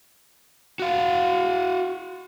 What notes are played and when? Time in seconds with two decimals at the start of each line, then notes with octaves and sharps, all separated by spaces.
0.79 F#4 F5